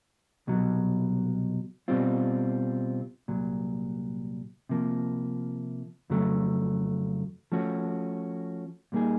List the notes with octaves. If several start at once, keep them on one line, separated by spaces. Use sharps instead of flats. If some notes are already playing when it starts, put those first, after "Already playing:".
C2 B2 F#3
B2 G3 C4 F4
C2 A#2 F#3
C3 F3 A#3
F2 C#3 F#3 A3
F3 A3 C#4 F#4
A#2 G3 A#3 D#4 G#4